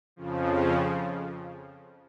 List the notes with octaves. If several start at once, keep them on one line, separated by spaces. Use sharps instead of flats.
F2 C#3 F3